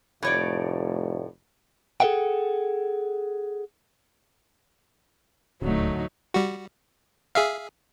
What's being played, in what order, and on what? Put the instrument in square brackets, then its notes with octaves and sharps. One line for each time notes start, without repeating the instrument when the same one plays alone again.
[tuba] F1 [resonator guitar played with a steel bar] A2 C#5 D5
[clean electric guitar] G#4 A4 B4 E5 F#5 G5
[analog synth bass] D#1 [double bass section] D2 A2 D3 [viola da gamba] F#3 A3 D#4
[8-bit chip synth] G3 F#4
G#4 E5 F5